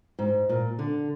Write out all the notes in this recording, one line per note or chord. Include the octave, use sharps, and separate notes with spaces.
G#2
A#2
D3